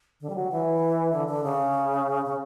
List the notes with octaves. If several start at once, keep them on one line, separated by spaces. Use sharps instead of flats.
D3
G3
F#3
E3
D3
D3
C#3
C#3